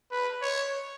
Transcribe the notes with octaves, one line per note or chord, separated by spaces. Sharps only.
B4
C#5